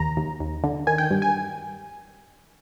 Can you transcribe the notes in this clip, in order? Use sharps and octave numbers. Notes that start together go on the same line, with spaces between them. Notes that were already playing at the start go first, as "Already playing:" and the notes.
Already playing: D#2 A#5
D#2
D#2
D3
D#3 G#5
G5
G2
G#5